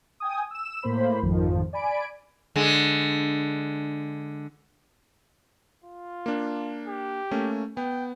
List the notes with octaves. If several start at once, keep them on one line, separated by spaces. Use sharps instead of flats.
G5 G#5 D#6
E6 E7
A2 A#3 C5 B5
G#1 F2 D#3 F3
D5 G#5 B5 D7
D3 G#3
F4
A#3 D4
G4
A3 A#3 C#4
B3 G5